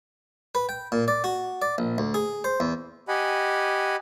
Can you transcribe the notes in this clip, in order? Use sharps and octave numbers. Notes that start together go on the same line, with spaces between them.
B4
G5
A#2
D5
F#4
D5
A#1
D2
G#4
C5
E2
G4 D#5 F#5 G#5 B5